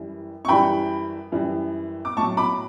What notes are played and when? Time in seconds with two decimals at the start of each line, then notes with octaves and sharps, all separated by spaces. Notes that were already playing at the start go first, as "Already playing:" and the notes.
Already playing: F#2 E3 G3
0.45 C#6
0.48 F#2 E3 G3 G5 B5
1.32 F#2 E3 G3
2.05 D6
2.17 A2 A5 C#6
2.21 F#3
2.37 B5 D6